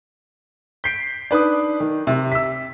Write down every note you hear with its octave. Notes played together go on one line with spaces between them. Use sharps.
G6 B6 C7 D7
D4 D#4 B4 D#6
D#3
C3 G4 E5
E6 B6